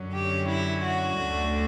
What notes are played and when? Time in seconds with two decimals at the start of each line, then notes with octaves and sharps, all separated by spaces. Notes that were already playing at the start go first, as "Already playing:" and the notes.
Already playing: F#2 D3 F#3 C#4
0.13 G4
0.48 E4
0.84 F#4
1.20 D2 D3 A3 D4